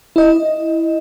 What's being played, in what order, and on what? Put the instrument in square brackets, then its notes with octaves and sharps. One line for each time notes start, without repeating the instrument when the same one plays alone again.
[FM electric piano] E4 D#5